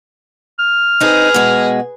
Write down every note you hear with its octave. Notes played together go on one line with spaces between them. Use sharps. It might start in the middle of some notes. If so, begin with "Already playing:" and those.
F6
C4 D#4 G#4 B4
B2 G#3